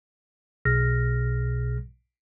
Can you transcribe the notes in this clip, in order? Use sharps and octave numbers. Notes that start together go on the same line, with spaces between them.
B1 B2 G#4 F6 A#6